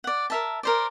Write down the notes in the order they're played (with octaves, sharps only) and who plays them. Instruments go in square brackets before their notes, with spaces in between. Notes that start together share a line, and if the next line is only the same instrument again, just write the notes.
[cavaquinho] D5 F#5
A#4 E5 A5
A#4 C5 D5